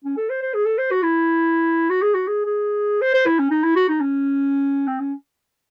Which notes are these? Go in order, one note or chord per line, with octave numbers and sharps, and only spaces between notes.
C#4
A4
C5
C5
G#4
A4
C5
F#4
E4
F#4
G#4
F#4
G#4
G#4
C5
C5
E4
C#4
D#4
E4
F#4
D#4
C#4
C4
C#4